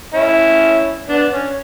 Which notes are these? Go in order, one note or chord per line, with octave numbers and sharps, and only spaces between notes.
C#4 E4
B3 D4
C#4